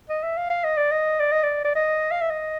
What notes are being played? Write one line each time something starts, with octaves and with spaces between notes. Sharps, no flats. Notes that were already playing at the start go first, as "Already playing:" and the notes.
D#5
E5
F5
F5
D#5
D5
D#5
D5
D#5
D5
D5
D#5
F5
E5
D#5